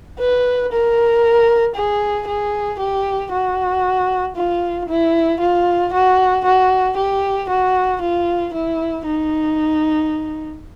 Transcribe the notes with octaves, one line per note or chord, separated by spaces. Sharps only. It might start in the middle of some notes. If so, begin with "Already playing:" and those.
B4
A#4
G#4
G#4
G4
F#4
F4
E4
F4
F#4
F#4
G4
F#4
F4
E4
D#4